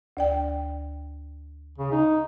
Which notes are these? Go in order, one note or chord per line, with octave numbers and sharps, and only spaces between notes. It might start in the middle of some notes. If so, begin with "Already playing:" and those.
D2 D5 G5
C#3
D#4